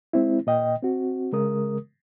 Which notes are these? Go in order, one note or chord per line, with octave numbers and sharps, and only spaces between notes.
G#3 C4 E4
A#2 D#5 G5
C4 F#4
C#3 G#3 A#4 D#6